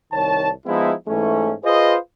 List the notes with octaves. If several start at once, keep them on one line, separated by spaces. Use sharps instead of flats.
C2 D#3 C#5 A5
F3 G#3 B3 D#4 E4
G#2 E3 A3 C#4
F4 G#4 B4 C5 D#5